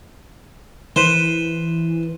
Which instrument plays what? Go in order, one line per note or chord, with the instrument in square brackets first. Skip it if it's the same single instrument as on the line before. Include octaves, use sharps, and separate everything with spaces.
[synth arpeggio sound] E3 [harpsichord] B4 C5